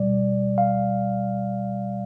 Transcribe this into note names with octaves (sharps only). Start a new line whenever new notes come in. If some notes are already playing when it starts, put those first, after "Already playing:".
Already playing: B2 G3 D5
F5